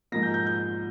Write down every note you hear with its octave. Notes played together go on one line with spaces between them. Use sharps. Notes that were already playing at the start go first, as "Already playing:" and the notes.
G#2 F3 A#3 A#6
G6
G6
G6